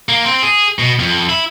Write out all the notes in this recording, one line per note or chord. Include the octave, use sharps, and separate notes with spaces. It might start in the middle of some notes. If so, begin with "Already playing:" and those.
A#3
C4
G#4
B2
F2
E4